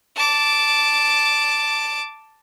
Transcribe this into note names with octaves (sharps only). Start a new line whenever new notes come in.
A5 D6